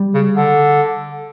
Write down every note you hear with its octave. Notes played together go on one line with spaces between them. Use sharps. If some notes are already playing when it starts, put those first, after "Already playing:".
Already playing: G3
C#3
D3